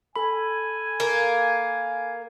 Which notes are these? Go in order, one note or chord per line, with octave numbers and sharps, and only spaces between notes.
A4 G#5 B5
A#3